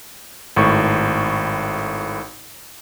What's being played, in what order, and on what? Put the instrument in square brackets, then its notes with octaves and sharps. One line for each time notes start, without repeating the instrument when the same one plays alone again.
[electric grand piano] G#1 A2 C#6